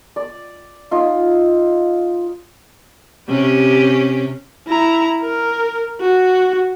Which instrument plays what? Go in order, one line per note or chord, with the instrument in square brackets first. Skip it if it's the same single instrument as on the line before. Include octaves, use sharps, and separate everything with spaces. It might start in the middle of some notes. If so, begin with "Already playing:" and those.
[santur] D5
D#4 F4
[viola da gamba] C3 C#4 G4
[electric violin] E4 A#5
A#4
F#4